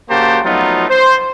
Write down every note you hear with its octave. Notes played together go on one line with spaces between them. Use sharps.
C#3 A#3 F#4 G4 C5 A5
F3 F#3 A3 B3 D#4 F4
C5